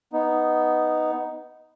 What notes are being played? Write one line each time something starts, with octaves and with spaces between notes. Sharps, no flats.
B3 D#4